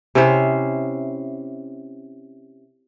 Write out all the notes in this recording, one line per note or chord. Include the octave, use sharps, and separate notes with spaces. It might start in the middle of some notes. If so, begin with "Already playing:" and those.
C3 C#4 E4 C5